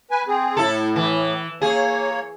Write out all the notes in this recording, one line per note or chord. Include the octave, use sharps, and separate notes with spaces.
B4 G#5
C4 G#4
A2 E4 A4
E3
A#3 G#4 C#5